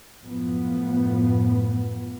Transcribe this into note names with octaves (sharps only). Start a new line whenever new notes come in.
F#2 A2 F3 B3